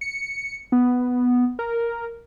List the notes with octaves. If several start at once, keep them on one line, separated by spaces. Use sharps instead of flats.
C#7
B3
A#4